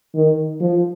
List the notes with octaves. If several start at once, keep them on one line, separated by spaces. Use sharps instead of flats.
D#3
F3